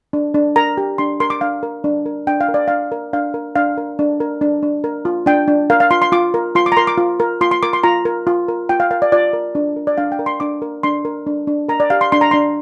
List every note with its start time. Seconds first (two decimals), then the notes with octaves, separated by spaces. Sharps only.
0.13 D4
0.34 D4
0.56 A#4 A#5
0.77 G4
0.98 D4 C6
1.20 A#4 C6
1.30 D6
1.41 D4 F5
1.63 A#4
1.84 D4
2.06 A#4
2.27 D4 G5
2.41 F5
2.49 A#4
2.54 D5
2.68 D4 F5
2.92 A#4
3.13 D4 F5
3.34 A#4
3.56 D4 F5
3.77 A#4
3.99 D4
4.20 A#4
4.41 D4
4.62 D4
4.84 A#4
5.05 F4
5.26 D4 G5
5.48 D4
5.70 A#4 F5
5.80 F5
5.91 F4 C6
6.02 C6
6.12 F4 D6
6.34 A#4
6.55 F4 C6
6.66 D6
6.72 A#5
6.77 A#4 C6
6.87 D6
6.97 F4
7.20 A#4
7.41 F4 C6
7.51 C6
7.63 A#4 D6
7.73 C6
7.84 F4 A#5
8.05 A#4
8.27 F4
8.48 A#4
8.69 F4 G5
8.80 F5
8.91 A#4 F5
9.02 D5
9.12 F4 D5
9.33 A#4
9.55 D4
9.76 A#4
9.87 D5
9.98 D4 F5
10.12 G5
10.19 A#4
10.26 C6
10.40 D4 D6
10.62 A#4
10.83 D4 C6
11.05 A#4
11.27 D4
11.47 D4
11.68 A#4 A#5
11.80 D5
11.90 G4 F5
12.01 C6
12.12 D4 C6
12.21 A#5
12.31 D4 C6